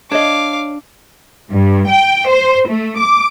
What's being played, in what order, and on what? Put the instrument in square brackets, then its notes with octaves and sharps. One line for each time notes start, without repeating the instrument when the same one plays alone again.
[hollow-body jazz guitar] D4 [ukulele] C#5 D#5 [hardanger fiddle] F5 D6
[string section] G2
G5
C5
A3
D6